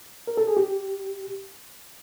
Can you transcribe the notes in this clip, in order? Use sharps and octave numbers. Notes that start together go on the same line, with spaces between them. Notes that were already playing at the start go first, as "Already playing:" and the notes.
A#4
A4
G#4
G4